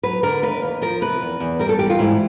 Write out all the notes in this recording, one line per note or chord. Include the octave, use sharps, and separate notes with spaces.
F#3 B4
D3 A#4
D#2 B4
D#2
F3 A#4
C3 B4
E2
E2
G3 A#4
A4
E3 G4
F4
G#2 E4